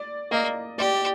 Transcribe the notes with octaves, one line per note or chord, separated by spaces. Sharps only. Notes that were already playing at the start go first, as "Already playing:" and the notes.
Already playing: D5
A#3 D#5
G4 D5